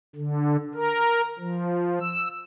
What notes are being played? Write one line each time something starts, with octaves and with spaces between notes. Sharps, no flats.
D3
A#4
F3
E6